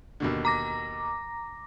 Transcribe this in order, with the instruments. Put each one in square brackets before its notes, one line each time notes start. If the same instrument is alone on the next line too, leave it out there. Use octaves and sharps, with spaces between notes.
[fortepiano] D#2 B2 D3
[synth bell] A#5 D6 A#6